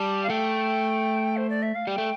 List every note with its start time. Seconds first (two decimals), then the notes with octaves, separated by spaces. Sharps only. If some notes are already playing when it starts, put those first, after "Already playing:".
Already playing: G3 A5
0.23 F5
0.30 A3 G5
1.36 C5
1.49 D5
1.62 E5
1.75 F5
1.87 G3 G5
1.98 A3